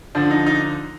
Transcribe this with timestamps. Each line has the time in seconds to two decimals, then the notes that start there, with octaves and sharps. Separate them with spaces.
0.15 D3 F3 D4
0.31 D#4
0.46 D#4